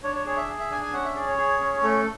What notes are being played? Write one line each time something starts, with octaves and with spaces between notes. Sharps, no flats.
D4 C#5
C#5
G#4 C#5
E5
G#4
E5
D4 G#5
G#5
C#4 F#5
E5
G#4 D5
C#5
G#4
C#4
A3 A4